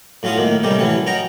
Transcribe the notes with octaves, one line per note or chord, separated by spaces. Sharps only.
A2 F#3 C#4 F4 F#4 D#6
A2 D#3 A#3
C3 D#3 G3 A3 C#4 G4
A1 E3 F#3 C#4 C#5
C#4 F#4 D#5 G5 A#5